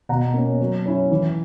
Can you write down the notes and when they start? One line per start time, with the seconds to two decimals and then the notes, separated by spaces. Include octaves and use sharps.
0.09 B2 F#5 A#5
0.34 A#3 C#4
0.60 F#3
0.86 C#4 E4
1.11 E3